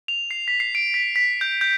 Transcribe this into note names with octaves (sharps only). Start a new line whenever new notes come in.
F7
C7
B6
C7
D7
B6
B6
G6
G6